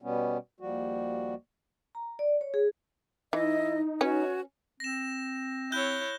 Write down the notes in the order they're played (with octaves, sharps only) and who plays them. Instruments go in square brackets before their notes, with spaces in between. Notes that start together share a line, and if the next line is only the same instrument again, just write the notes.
[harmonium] B2 G3 B3 C#4
D#2 F3 G3 F#4
[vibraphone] A#5
D5
C#5
G#4
[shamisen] E3 [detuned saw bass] D#4 [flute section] E4 D#5
[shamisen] C#4 B4 [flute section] F#4 C#5 G#5
[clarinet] C4 [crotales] A#6 E7
[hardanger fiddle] E4 C#5 [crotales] F#6 G6 G7